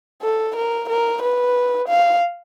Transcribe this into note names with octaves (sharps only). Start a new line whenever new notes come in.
A4
A#4
A#4
B4
F5